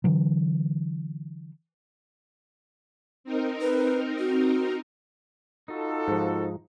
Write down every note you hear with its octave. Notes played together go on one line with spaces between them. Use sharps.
D3 E3 F#3
C4 D#4 A#4
B4
F#4
D#4 F4 F#4 A4
G#2 F3